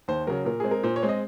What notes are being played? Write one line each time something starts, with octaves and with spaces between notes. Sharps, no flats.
D#2 C5
C#3 F#3 A#4
A#2 A#4
G#3 C4 G#4
A#4
A#2 C5
C#5
G#3 C4
D#5